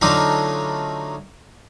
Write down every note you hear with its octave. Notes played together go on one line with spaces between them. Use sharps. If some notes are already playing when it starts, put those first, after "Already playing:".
D3 F#3 A3 D4 D#4 F4